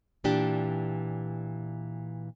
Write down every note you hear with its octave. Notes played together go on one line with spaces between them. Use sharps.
A#2 E3 D4 G4